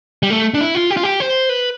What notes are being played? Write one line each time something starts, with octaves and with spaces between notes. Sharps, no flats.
G3
A3
D4
E4
F4
G4
F4
G4
C5
B4